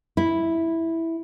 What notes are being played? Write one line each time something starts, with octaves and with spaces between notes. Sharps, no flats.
E4